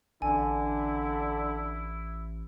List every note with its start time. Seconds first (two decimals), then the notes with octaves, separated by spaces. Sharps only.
0.22 A1 D3 E4 G#5